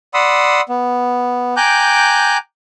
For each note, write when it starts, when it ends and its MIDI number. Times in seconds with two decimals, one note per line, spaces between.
0.14 0.61 74
0.14 0.61 78
0.14 0.61 83
0.14 0.61 84
0.14 0.61 87
0.14 0.61 88
0.69 1.55 59
1.57 2.37 79
1.57 2.37 80
1.57 2.37 82
1.57 2.37 86
1.57 2.37 90
1.57 2.37 91